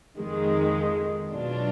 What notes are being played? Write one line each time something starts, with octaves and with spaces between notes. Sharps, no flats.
F2 D#3 G#3
B2 F#3 D4 F4